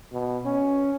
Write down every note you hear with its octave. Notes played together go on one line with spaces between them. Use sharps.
B2
C#4